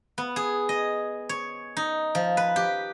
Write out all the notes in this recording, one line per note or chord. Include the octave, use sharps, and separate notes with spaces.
B3
G#4
D#5
C#5
D#4
F3
B4
G4